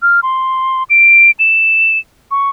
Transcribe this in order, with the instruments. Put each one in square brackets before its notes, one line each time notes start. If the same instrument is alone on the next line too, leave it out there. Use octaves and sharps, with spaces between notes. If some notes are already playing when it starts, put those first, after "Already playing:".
[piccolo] F6
C6
D7
E7
C#6